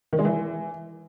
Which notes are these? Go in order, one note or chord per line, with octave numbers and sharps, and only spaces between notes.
D#3
G#3
E3